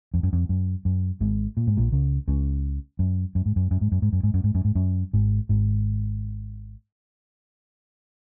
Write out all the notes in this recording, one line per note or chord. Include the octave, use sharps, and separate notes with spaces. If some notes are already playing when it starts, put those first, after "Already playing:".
F2
F#2
F2
F#2
F#2
G#1 G#2
A#2
G#2
A#1 A#2
C#2 C#3
C#2 C#3
F#2
F#2
G#2
F#2
F#2
G#2
F#2
G#2
F#2
G#2
F#2
G#2
F#2
G#2
F#2
G#1 G#2
G#1 G#2